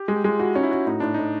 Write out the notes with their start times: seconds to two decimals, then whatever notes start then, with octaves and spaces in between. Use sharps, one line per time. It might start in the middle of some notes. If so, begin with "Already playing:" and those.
Already playing: G4
0.08 G#3
0.16 G4
0.24 G#3 F4
0.39 E4 F#4
0.55 C#4 D#4
0.63 E4
0.71 F#4
0.87 A2 D#4
1.00 A2 D4
1.14 A2 D#4